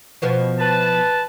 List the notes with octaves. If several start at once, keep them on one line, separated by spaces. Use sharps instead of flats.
B2 F3 B3
B4 A5